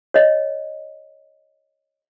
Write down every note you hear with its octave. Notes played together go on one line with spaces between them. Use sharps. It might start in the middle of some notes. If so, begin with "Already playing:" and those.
C#5 D#5